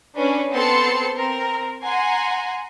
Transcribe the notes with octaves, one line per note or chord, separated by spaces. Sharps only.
C#4 D4 B4
B3 C4 A4 A5 C6 C#7
C4 A#4
F#5 G#5 A#5 C6